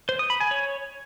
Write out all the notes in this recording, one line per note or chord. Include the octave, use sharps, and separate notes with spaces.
C5
D#6
B5
G#5
C#5